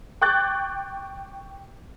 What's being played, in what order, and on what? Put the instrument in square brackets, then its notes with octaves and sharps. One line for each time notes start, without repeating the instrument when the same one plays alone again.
[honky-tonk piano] G5 C#6 D6 F#6 G6 A6